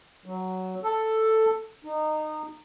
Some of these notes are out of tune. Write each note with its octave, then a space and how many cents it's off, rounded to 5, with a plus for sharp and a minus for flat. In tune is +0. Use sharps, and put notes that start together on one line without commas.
F#3 +10
A4 +5
D#4 -20